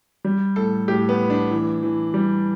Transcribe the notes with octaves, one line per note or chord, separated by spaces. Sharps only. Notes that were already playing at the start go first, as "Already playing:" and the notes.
G3
A2 A4
A2 G4
B3
A2
D4
E3
E3
G3